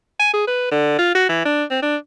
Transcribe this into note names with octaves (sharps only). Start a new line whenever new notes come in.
G#5
G#4
B4
D3
F4
F#4
E3
D4
C4
D4